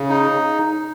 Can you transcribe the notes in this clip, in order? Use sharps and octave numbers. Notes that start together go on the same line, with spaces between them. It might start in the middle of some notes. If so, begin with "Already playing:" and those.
Already playing: C#3
D#4